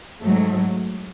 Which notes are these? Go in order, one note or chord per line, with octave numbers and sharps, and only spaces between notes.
G#2 F#3 A3